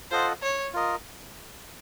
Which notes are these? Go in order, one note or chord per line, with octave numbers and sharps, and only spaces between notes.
F4 A4 C5 D#5 F#5
C#5
F4 A#4 D#5